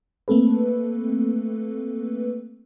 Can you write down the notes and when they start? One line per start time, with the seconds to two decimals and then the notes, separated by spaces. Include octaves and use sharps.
0.28 A3 A#3 C4 A4 B4